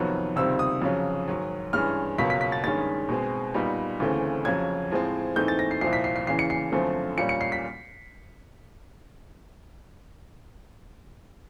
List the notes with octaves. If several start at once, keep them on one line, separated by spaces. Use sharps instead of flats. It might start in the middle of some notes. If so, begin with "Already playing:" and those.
Already playing: F2 C3 D#3 F#3 B3
C#2 C3 D#3 G3 C4 E6
D#6
F2 C#3 F#3
G#2 D#3 F#3
G2 E3 G#3 C#4 F6
C#2 B2 F#3 A#3 B6
B6
B6
A6
G2 D#3 G#3 C#4 A6
B2 G#3 C4
A#2 G3 B3 D#4
D2 C#3 E3 A3 C4
F2 C#3 F#3 G#6
A2 F3 G#3 C4
G#2 E3 A3 C4 D#4 G6
A6
A#6
C7
C2 A#2 F3 C7
B6
C7
C7
E2 C#3 E3 C7
C#7
C7
F#2 D3 F3 A3 C4
A#2 G3 A#3 C#4 C#7
C#7
C7
B6